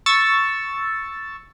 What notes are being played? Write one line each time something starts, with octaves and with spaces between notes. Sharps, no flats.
C#6 E6 A6